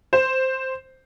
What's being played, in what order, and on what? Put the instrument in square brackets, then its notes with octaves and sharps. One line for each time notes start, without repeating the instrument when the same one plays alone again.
[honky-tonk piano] C5